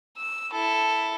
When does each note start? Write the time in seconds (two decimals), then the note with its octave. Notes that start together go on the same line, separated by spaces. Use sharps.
0.17 E6
0.52 E4 A4